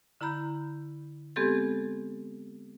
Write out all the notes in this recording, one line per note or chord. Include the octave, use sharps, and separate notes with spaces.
D3 E4 A#5 B5 G6
G#3 B3 C4 G4 A4 G#6